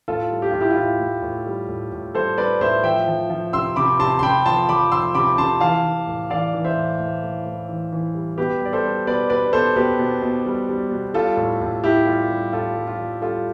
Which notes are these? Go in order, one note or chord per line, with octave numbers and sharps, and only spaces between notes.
A2 F4 A4
G3
G4
A2 F4
E4 G4
F4
A2 E4
A2
A2
G3
A2
A2
G3 A4 C5
G3 B4 D5
A2 C5 E5
F3 E5 G5
F3
F3
C3 C6 E6
C3 B5 D6
C3 A5 C6
C6
C3 G5 B5
F3 A5 C6
F3 B5 D6
F3 C6 E6
C3 B5 D6
C3 A5 C6
E3 F5 A5
E3
A2
E3 D5 F5
E3
C5 E5
A2
A2
A2
A2
E3
E3
G3
B2 G4 B4
G3 D5
A4 C5
G3
B2 B4 D5
B2 B4 D5
B2 A4 C5
B2 G4 B4
B2
B2
G3
G3
B2
G3 F4 A4
A2
A2
A2 E4 G4
G3 F4
G3
A2 F4 A4
G3
F4
G3
G3 F4 A4